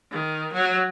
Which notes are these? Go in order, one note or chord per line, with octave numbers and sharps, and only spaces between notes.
D#3
F#3